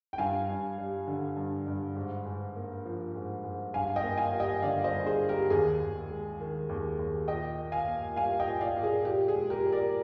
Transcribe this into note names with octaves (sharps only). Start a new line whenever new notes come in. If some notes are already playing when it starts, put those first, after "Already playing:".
G5
G2 F5 G#5
G2
G3
D3
G2
G2
G#2
G#2
A#3
F3
G#2
G#2
G2 F5 G#5
D#5 G5
A#3
F5 G#5
G3
D#5 G5
D3 D5 F5
C5 D#5
G2
G#4 C5
A#3
G4 A#4
D#2 G#4
D#2
G#3
D#3
D#2
D#2
A#2 D#5 G5
A#2
F5 G#5
A#3
G3 F5 G#5
D#5 G5
A#2
D5 F5
A#2
G#4
A#2 G4
G#4
G#3
G4 A#4
A#2
A#4 D5